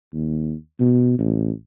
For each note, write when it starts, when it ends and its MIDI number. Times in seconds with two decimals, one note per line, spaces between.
0.13 0.54 39
0.79 1.14 47
1.19 1.51 33